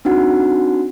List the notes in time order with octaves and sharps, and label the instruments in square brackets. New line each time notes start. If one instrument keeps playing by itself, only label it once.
[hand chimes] C4 D4 D#4 F#4 F#5